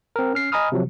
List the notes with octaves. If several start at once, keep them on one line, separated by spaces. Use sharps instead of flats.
C4 A#4
C#4 F6 C7
D#5 G#5 A#5 B5 D#6 F6
C3 F3 F#3